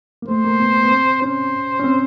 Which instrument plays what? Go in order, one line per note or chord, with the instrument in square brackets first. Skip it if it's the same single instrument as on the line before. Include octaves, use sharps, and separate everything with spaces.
[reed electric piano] A#3
[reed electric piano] A3 [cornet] C5
[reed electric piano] A#3
B3
B3
C4
[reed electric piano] C#4 [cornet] C5
[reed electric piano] C#4
C4